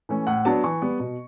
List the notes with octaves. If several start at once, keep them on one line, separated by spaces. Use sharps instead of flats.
E3 A3 C#4
A2 F#5
F#3 B3 D4 A5
E3 C#6
G3 B3
B2